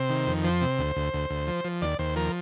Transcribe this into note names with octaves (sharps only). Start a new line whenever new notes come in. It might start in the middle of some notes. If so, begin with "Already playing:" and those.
Already playing: C3 C5
D#3
F2
F3 C5
C3
D2
D2
D2
D2
F3
F3
D#2 D5
D#2 C5
F3 A#4